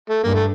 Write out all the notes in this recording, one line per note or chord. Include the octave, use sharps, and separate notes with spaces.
A3
G2 A#3
A3